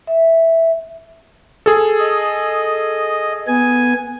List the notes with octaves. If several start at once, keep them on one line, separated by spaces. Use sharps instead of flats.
E5
G#4 A4
D#5
B3 G#5